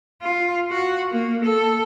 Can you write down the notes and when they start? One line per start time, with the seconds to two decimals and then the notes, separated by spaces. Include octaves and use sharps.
0.22 F4
0.71 F#4
1.11 A#3
1.45 A4